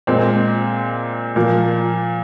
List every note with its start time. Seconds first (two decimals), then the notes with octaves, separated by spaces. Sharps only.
0.07 A#2 G#3 C4
1.36 A#2 F3 A#3